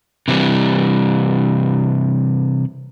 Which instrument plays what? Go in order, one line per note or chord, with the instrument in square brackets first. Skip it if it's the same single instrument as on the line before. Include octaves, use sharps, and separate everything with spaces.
[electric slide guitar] C3 E3 F#3 G3